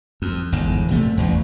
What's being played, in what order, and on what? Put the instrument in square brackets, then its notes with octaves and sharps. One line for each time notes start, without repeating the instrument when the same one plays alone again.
[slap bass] F2
G1 E2 G#2
A#1 C3 A3
A1 E2